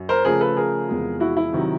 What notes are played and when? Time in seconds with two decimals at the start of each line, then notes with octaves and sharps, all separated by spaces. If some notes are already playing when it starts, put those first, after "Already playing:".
Already playing: F#2
0.09 A#4 C5
0.25 C#3 F3 A3 G#4 A#4
0.40 A4 B4
0.57 G#4 A#4
0.89 E2 C3 F3 G#3
1.20 E4 F#4
1.37 E4
1.53 C3 D#3 F#3